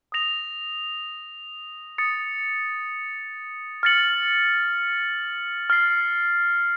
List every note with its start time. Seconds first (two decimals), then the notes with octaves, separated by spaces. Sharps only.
0.12 D#6 A#6 F7
1.98 D#6 A6 C#7
3.83 F6 A6 C#7 F#7
5.70 F6 A6 C7